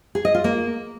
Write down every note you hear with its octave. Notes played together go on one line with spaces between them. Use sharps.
G#4
D#5
F4
A#3